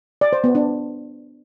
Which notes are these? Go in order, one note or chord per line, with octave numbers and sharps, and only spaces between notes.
D5
C5
B3
D4